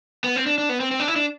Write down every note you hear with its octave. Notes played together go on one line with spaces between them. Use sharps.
B3
C4
D4
D4
B3
C4
C4
D4
E4
D4